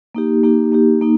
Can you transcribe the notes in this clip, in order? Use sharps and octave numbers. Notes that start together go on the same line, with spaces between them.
A#3 D#4 G4
A#3 D#4 G4
A#3 D#4 G4
A#3 D#4